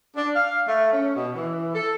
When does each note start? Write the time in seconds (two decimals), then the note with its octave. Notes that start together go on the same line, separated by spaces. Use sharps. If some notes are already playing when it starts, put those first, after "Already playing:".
0.15 D4
0.35 F5
0.68 A3
0.92 C#4
1.15 B2
1.35 E3
1.74 A4